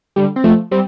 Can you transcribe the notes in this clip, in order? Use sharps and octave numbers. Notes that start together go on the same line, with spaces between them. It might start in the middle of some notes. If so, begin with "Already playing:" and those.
D3 G3
C4
F3 A3
G3 C4